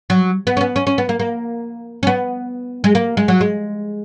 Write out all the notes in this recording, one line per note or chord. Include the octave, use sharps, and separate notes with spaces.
F#3
B3
C#4
B3
C#4
C#4
B3
A#3
A#3
C#4
B3
G#3
A#3
G#3
F#3
G#3